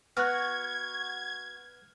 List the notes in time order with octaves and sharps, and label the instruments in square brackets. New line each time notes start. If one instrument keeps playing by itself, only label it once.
[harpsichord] B3 [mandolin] F#4 [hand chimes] F6 F#6 [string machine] G#6